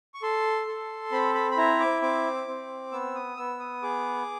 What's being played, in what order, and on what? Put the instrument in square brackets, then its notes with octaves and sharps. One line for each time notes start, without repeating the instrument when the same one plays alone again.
[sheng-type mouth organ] C#6
A4 C6
A4
C4 B5
B5
B5
E4 A#5
D6
C4 D6
C4
B3 E6
D#6
B3 E6
D#6
G#4 D6